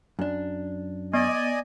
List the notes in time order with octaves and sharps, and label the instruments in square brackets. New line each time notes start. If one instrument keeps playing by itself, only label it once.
[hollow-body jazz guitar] F#2 D4
[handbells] B3 [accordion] D5 D#5 G#5